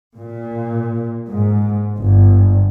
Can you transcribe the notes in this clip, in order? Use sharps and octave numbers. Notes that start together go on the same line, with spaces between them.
A#2
G#2
G1